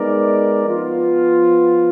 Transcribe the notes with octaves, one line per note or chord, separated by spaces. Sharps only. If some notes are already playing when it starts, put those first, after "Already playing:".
Already playing: G#3 B3 D#4 A#4 D5
F3 B3 F4